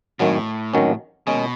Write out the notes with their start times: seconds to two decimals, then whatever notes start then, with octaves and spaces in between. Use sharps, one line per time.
0.19 G#1 F#2 A2 D#3 F#3 C#4
0.73 G#1 F#2 D#3 F#3 C#4
1.27 D#2 B2 D#3 G#3 C#4 G#4